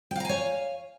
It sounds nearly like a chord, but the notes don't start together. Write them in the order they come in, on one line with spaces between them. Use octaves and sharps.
G5 F5 A#5 G#5 C#5